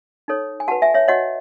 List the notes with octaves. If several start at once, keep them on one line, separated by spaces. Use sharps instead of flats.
D#4 A4 C#5
G#5
F#4 B4 F#5 A5
E5 G#5
C#5 E5
F#4 C#5 D#5 F#5